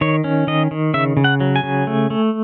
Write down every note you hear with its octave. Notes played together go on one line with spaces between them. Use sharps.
D#3 C#5
C#4
D#3 D#5
D#3
C#3 E5
C#3
F#5
F#3
G#5
C#3
A3
A3